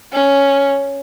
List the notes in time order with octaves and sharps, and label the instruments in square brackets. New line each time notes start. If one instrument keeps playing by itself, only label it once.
[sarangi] C#4